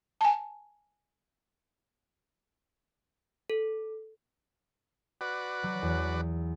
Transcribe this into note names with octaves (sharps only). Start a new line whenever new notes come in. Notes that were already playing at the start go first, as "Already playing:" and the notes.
G#5 A5
A4
F#4 B4 D5
F#3
E2